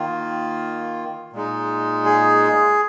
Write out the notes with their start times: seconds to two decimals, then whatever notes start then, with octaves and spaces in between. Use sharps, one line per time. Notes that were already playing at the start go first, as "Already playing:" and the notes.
Already playing: D#3 A#3 F4
1.33 A#2 G#3 D#4
2.05 G#4